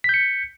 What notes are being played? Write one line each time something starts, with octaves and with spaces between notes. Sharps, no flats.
G6 B6 C#7